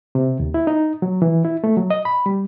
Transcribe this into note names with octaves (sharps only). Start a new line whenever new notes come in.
C3
D#2
E4
D#4
F#3
E3
E4
A3
F#3
D#5
B5
G3